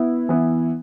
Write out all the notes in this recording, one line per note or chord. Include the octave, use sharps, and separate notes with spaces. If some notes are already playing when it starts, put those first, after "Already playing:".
Already playing: B3 E4
E3 B3 E4